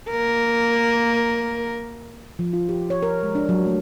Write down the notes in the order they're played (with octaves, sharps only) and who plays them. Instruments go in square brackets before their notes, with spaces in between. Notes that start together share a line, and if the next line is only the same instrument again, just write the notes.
[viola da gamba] A#3 A#4
[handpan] F3
F4
G4
C#5
A#4
G#3
D4
F#3
A3